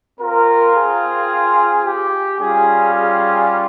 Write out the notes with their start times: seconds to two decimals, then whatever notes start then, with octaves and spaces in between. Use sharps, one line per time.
0.20 C4 F4 A#4
0.75 G#4
1.85 G4
2.40 G3 C#4 F4 G#4
2.95 G#4